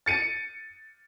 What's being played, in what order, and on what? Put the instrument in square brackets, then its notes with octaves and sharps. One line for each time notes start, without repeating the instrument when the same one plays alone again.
[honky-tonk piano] A6 C#7 D#7